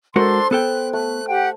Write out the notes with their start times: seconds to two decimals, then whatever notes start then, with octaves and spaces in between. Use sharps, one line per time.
0.16 G#3 D4 F#4 A4 A#4 C5 C6
0.51 B3 A4 G5 F#6
0.93 A3 F#6
1.28 G4 F#5 G5